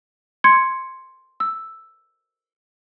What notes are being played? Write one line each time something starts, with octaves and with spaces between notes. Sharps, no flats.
C6 G#6 C#7
E6